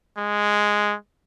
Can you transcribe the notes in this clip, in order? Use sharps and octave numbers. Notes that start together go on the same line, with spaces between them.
G#3